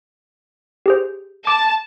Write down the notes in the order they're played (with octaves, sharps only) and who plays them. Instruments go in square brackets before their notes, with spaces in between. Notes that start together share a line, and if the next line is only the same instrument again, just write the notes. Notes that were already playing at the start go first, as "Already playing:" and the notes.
[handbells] G4 G#4 C5
[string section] A5 [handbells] D6